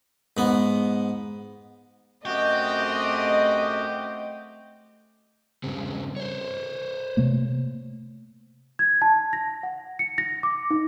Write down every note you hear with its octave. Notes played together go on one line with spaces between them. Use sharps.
G#2 B3
F#2 A3 C4 F#4 G4 D#5
G2 C#3 C4
C5 C#5
C3 A3 A#3
G#6
A5
A#6
F#5
C#7
A#6
D6
D#4